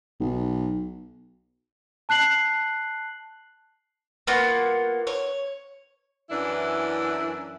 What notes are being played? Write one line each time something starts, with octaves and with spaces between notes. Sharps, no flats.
B1
A5 F#6 C7 F#7
A#3 B3 F4 F#4
C#5
F#2 E3 D4 E4